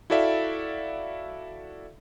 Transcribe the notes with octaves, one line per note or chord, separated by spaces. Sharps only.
E4 F#4 A4 D5 E5 F5